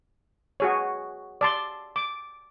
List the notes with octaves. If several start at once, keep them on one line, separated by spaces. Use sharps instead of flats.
F#4 G#4 C#5
D5 A5 C6
D6